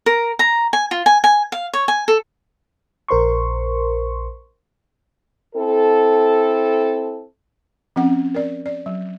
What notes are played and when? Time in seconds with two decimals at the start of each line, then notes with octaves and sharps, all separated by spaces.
0.06 A#4
0.39 A#5
0.73 G#5
0.91 F4
1.06 G#5
1.24 G#5
1.52 F5
1.74 C#5
1.88 G#5
2.08 A4
3.08 A#1 A#4 C5 C6 C#6
5.55 C4 E4 A4
7.96 F3 C4 C#4 F#5
8.35 A#4 D5
8.66 D5
8.86 F#3